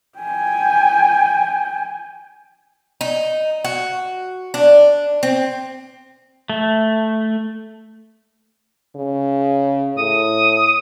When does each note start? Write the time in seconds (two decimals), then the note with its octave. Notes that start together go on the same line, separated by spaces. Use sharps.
0.18 G5 G#5
3.01 D#4
3.64 F#4
4.54 D4
5.23 C4
6.50 A3
8.96 C#3
9.98 A2 D#6